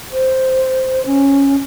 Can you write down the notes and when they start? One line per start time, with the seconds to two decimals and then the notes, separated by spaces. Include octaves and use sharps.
0.12 C5
1.06 C#4